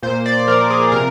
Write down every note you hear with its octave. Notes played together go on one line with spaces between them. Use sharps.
A#2 C5
D5
F3 A#4
G#4
C3 A#4